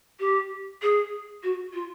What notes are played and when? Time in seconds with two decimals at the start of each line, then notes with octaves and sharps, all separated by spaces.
0.20 G4
0.82 G#4
1.43 F#4
1.74 F4